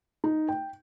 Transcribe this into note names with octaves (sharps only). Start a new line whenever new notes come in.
D#4
G5